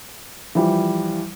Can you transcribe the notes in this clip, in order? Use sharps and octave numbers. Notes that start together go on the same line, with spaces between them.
E3 F3 G3